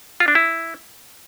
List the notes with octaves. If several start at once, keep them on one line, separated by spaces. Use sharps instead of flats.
F4
D4
E4